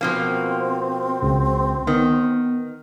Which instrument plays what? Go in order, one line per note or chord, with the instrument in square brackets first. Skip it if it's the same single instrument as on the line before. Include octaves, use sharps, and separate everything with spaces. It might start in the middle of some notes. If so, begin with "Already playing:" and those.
[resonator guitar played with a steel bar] B2 F3 A#3 [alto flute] C4
[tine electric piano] C#2 C#3
[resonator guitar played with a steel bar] D#3 [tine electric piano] B3